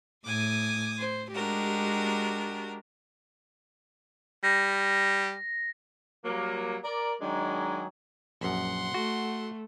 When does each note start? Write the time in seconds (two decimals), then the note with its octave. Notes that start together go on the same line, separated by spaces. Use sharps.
0.25 A2 G#5 D6 D#6
0.99 C5
1.33 G#3 D4 F#4 G4 A#4
4.44 G3 A#6
6.24 F#3 G3 A#3
6.84 A#4 D5
7.21 D#3 F#3 G#3 D4 G#5
8.41 A#1 F#2 F#5 C6
8.94 A3 F#4